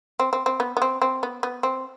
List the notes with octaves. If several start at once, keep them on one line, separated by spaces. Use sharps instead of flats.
C4
C4
C4
B3
B3
C4
C4
B3
B3
C4